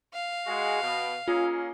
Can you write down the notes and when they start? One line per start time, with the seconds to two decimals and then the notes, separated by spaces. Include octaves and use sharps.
0.13 F5
0.46 G#3 F#4
0.82 B2
1.28 A#3 C#4 F4 G#4